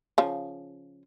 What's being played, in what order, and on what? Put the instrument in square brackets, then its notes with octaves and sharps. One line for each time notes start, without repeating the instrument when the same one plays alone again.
[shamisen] C#3 F3